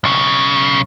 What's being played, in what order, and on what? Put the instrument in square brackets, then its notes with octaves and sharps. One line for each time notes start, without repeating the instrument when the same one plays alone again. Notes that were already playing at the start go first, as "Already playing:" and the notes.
[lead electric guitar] B1 C#3